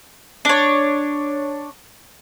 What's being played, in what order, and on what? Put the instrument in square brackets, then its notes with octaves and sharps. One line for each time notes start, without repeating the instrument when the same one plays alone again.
[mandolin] D4 C#5